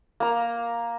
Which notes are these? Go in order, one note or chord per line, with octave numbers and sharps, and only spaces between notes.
A#3 A#5